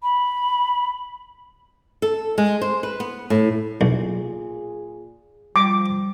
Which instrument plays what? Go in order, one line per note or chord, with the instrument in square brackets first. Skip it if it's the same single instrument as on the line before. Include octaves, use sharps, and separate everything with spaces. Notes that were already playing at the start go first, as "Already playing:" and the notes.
[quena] B5
[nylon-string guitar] A4
G#3
C5
B4
B3
A2
[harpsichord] B1 [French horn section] A#2 G#4
[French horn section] F3 [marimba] G3 [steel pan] D6